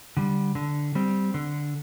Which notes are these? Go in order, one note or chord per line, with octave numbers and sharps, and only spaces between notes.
D3 G3
D3
G3 C4
D3